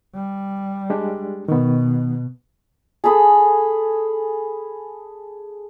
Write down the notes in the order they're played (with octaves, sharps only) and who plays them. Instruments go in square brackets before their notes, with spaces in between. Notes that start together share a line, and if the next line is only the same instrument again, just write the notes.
[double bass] G3
[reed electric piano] G#3 D4 G4
[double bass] B2 [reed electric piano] D#3 B3
[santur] G#4 A4 B5 D#6